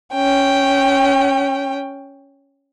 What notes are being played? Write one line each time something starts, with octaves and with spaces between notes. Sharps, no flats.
C#4 G5